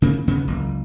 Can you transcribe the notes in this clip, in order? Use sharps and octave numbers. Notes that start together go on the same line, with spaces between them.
C#3 A#3
D#2 C#3 B3
F#1 C#2